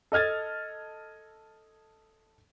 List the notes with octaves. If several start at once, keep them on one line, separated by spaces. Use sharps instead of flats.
A4 D#5 F6 G#6 A6